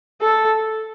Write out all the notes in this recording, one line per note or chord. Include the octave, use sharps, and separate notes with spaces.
A4